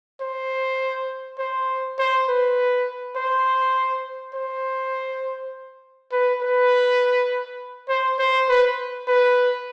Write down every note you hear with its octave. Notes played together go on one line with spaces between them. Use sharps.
C5
C5
C5
B4
C5
C5
B4
B4
C5
C5
B4
B4